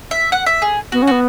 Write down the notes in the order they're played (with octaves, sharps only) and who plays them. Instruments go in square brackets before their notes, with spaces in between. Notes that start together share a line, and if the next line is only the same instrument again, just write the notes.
[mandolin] E5
F#5
E5
G#4
[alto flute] B3 [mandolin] F#4
[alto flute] C#4
[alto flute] B3 [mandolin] F#4